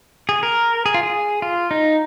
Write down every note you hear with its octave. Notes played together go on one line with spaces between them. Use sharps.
G#4
A#4
G#4
F4
G#4
F4
D#4